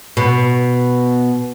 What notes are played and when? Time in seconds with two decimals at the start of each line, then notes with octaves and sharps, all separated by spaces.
0.17 B2